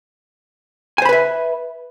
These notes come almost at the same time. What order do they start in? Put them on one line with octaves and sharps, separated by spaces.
G#5 C5 B5 B4 E5